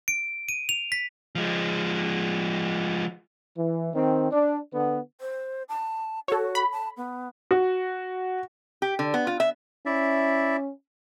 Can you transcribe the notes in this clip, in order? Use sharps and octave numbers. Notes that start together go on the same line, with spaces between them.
D7
D#7
F7
B6
F3 G#3
E3
D#3 C4
D4
D3 B3
C5
A5
F#4 A4 C#5
B5
A5
B3
F#4
G4
D3
B3
F4
E5
C#4 E4 D5 E5